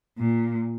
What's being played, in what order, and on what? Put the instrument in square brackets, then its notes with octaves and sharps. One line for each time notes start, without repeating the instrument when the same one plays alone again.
[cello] A#2